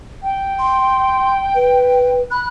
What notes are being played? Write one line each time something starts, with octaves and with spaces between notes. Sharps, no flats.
G5
C6
B4
B5 F#6